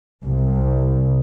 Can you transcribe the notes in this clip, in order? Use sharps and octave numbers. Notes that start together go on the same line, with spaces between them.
C2